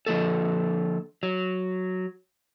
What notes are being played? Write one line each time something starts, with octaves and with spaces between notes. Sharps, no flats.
D3 F3 A#3 A4
F#3